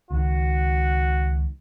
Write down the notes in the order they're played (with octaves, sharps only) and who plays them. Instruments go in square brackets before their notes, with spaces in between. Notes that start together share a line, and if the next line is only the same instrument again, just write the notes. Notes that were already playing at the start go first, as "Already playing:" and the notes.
[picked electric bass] C#2 D#3 [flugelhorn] F#4